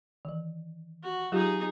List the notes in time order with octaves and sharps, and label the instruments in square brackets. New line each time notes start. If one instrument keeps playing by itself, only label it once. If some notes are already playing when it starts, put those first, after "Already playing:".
[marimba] D#3 E3
[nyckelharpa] F#4
[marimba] F#3 F4 G4 [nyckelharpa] D#4 G#4